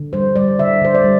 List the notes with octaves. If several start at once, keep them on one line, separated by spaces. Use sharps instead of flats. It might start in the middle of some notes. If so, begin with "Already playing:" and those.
Already playing: D3
G3 C5
G3 D5
D3 E5
D3 C5
D5
G3